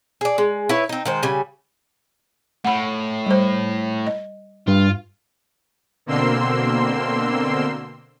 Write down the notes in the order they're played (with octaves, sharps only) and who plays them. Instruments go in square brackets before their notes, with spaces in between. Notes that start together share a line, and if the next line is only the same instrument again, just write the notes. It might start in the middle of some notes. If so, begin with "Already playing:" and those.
[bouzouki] G#4 D5
G#3
E4 B4 C#5
C4 D#4
D#3 G#3 C5
C#3 G3 G#5
[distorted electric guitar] A2 [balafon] F#5 B5
[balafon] G3 C5
D#5
[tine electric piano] G2 [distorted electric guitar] F4
[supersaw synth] B2 D3 A#3 C4 C6 E6